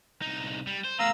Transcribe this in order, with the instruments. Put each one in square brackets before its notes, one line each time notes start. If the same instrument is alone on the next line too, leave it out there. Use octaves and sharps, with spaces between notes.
[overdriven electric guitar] C2 D#4
G3
C5
[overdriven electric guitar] A3 B3 [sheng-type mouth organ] F5 A#5 E6